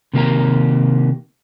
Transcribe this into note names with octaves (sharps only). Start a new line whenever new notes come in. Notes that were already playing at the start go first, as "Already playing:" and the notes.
C3 D#3 A#3 G4 A#4 A#5